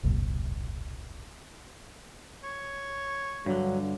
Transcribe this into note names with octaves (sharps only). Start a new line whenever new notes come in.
E1 C2 F#2 A#2
C#5
G2 D3 F#3